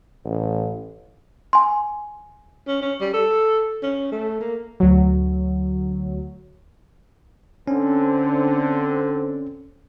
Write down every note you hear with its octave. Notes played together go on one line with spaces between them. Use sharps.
A1
G#5 C6
C#4
C#4
G3
A4
C#4
A3
A#3
D2 F#3
D3 C4 C#4